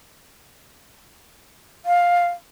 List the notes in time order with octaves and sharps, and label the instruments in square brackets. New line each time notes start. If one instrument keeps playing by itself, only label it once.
[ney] F5